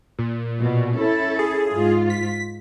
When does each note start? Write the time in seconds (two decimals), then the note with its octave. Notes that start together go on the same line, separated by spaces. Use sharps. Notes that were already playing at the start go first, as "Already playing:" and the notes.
0.19 A#2
0.60 B2
0.95 C#4 E4 A4
1.39 G#4
1.70 G#2 F4
2.10 B6